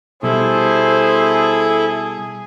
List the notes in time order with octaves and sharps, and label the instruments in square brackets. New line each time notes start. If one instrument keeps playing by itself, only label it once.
[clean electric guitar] B2 G3 [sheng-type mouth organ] E4 A4 [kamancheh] G#4 [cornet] C5